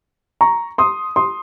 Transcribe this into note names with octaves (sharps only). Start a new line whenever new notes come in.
A#5 C#6
C6 D#6
C6 D#6